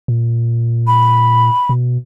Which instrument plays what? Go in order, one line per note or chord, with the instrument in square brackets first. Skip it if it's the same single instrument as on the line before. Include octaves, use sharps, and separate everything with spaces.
[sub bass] A#2
[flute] B5
[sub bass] B2